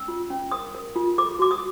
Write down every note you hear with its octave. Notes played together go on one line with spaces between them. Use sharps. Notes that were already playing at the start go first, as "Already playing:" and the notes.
Already playing: C#4 E6
F4
C#4
A#4 D#6
A#4
F4
A4 D6
F#4 D6
D#6